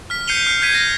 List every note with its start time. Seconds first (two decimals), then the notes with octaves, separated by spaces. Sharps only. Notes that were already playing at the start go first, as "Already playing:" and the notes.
0.10 F6 B6
0.27 G6 C7 C#7 D#7 F7 G7
0.47 F6
0.62 F6 G6 G#6 B6 D#7
0.74 A#6